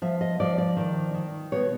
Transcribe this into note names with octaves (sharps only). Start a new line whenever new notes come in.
F3 E5
D#5
F3 D5
D5
D#3
D#3
B2 C#5